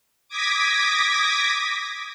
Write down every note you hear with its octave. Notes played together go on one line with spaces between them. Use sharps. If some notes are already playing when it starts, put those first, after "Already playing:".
D6 D#6 G#6 A#6 B6